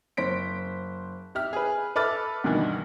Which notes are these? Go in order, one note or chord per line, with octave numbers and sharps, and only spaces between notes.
F#1 C5 B6 D7
G4 E5 F6
G#4 B4
A4 B4 E5 D6 F6 A6
D2 G2 B2 D#3 E3